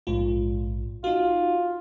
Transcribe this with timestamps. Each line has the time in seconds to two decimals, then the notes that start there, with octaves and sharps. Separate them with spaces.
0.07 A#1 G#2 F4
1.04 D#4 F4 F#4